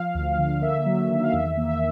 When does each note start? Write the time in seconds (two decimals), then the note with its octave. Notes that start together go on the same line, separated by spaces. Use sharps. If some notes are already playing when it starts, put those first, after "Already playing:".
Already playing: F3 F5
0.15 D2
0.39 D3
0.62 A#3 E5
0.86 F#3
1.10 D#3
1.24 F5
1.33 E2 E5
1.57 A#3
1.69 E5